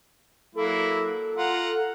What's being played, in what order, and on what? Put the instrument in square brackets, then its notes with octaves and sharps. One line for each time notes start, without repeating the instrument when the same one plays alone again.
[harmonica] F#3 A#3 E4 [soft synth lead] A4
[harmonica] F4 F#5 A#5